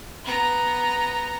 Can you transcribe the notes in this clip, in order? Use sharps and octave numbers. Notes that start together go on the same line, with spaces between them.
B3 A#5